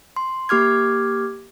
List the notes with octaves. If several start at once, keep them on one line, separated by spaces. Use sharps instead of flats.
C6
A#3 G4 D6 F6 G#6